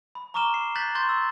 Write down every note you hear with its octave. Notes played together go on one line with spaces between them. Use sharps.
B5
A#5 C#6 D6 F6 E7 G7
C7
F#6 G6 A6 B6 F#7
C6 C#6 G6 A6
E6